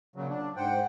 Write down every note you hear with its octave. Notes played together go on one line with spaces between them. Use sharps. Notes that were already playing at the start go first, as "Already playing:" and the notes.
A#2 C#3 F#3
D4
G#2 C5 F#5 G5